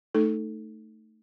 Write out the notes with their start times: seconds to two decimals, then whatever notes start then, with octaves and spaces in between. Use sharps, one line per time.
0.15 A3 D#4 A4